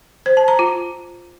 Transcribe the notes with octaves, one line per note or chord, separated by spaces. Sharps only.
C5
A5
A#5
F4